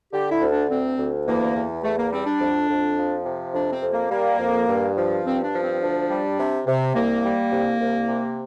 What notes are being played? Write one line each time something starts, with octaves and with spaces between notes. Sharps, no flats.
D3 G4
E4
D2
D4
D2 C4
D2
E2 A#3
E2
E2 A3
A#3
G3 C4
D4
F2
F2
F3
C3
F2 D4
C4
F2
A#3
G3 A#3
F2
G2
F3
G2 C4
D4
F3
C4
D2 D4
G3
C3
C3
C2 A#3
G3
C2
C2
C3